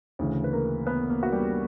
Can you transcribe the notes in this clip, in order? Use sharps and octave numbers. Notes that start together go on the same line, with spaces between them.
D2 C#3 E3
B4
A#3 A#4
B3 B4
A#3 A#4
F#4
G3 G4